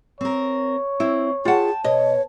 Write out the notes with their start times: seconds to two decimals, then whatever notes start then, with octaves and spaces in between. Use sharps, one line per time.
0.21 C4 A#4 C#5
1.00 C4 E4
1.45 F4 G#4 F#5 G5 A5
1.84 B2 C#5 D#5